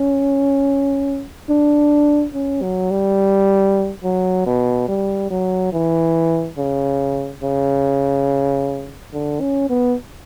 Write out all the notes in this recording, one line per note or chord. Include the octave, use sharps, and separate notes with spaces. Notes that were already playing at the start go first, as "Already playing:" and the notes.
Already playing: C#4
D4
C#4
F#3
G3
F#3
B2
G3
F#3
E3
C#3
C#3
D3
C#4
B3